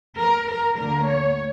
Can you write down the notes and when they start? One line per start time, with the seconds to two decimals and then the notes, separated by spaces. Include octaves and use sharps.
0.19 A#4
0.48 A#4
0.77 D2 D3 A#3 A#4
1.07 C#5